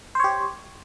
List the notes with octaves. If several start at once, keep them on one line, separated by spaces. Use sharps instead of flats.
G4 C5 C#5